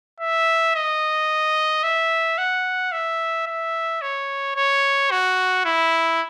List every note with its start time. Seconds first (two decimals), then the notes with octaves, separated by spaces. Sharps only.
0.20 E5
0.75 D#5
1.84 E5
2.38 F#5
2.92 E5
3.47 E5
4.02 C#5
4.56 C#5
5.11 F#4
5.65 E4